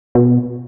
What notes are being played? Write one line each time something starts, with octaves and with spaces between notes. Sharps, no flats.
B2